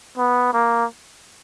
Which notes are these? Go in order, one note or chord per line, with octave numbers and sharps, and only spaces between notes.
B3
A#3